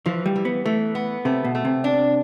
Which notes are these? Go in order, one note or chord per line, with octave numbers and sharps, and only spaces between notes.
E3 F3
G3
E3
B3
E3 A3
B3
C3 A3
B2
A3
C3
D4